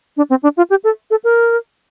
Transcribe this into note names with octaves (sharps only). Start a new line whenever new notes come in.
D4
C4
D4
F4
G4
A4
A4
A#4